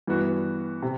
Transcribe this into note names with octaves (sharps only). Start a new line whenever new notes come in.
G2 E3 B3 F#4
C3